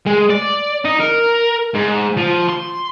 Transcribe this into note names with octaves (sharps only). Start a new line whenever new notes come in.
G#3
D5
D#4
A#4
G#2
F3
C6